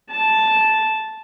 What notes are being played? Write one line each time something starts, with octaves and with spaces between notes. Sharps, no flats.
A5